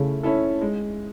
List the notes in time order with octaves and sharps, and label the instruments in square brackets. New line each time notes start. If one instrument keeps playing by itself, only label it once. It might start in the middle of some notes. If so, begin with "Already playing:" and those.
Already playing: [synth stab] C#3 [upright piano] A3 C#4 E4
[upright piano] C#4 E4 A4
G#3